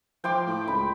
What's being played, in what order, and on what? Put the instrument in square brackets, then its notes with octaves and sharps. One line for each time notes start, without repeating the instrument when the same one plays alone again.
[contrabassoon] F3 [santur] G5 C6 D6
[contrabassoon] A2
[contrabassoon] C#2 [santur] B5